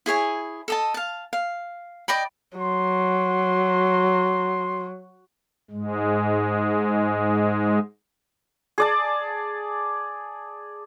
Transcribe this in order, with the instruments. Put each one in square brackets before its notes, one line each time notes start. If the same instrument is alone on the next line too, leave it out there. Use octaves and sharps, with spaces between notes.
[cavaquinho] E4 G#4 C#5 G#5
A4 D#5 A5
F5 A5
F5
D5 D#5 G5 B5
[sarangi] F#3 [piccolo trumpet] C6
[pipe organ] G#2 G#3
[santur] G#4 D5 A5